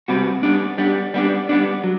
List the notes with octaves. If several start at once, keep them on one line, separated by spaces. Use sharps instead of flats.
C3 G3 C4 F#4 B4
G3 B3 D4
G3 B3 D4
G3 B3 D4
G3 B3 D4
F#3